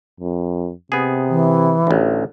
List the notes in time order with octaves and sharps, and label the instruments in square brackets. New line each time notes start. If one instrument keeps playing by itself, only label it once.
[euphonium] F2
[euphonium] C3 [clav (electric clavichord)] B3 G#4
[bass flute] E3
[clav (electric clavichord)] A1 D2